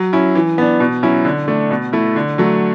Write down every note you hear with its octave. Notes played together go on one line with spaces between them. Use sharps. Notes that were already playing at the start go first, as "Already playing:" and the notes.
Already playing: F#3
C#4 E4
E3
B3 D4
B2
F#3 C#4 E4
D3
A3 D4
B2
A3 E4
D3
F#3 A3